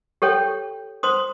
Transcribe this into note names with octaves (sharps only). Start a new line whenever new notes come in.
G4 A4 C#5 G5
C5 C6 D#6